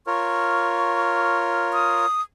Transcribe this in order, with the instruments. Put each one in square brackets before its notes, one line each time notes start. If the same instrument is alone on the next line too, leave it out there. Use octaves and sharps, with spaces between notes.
[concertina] F4 A#4 C#5 [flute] C#6
[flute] D#6